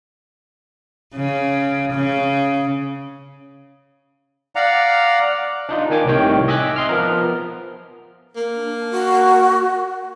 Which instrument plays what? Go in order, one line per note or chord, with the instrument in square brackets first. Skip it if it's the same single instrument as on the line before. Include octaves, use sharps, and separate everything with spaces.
[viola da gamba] C#3
C#3
[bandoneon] D5 F5 F#5 A#5
[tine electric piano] D4 D#4 F4
D#3 A#3 G#5 D6
C2 A2 C3 D#3 C#5 G5
D#5 E5 G#5 D6 F#6 B6
D#5 C6 F6
F3 B3 A#4
[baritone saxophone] A#3
[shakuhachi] D4
F#4